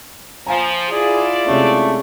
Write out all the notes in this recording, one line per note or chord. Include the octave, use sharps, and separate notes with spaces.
F3 F5 G#5 A#5
E4 F4 G#4 D5
C3 G#3 A3 C#4